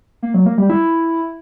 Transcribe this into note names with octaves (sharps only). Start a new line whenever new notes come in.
A#3
F#3
A#3
G3
E4